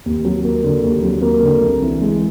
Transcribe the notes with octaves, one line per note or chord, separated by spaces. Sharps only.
D#2
F#3
A#3
D3
D#2
F#3
A#3
D3
C2
E3
G#3